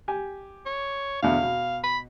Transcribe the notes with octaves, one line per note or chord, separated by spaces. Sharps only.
G4 G#5
C#5
E2 B2 D3 F5
B2
B5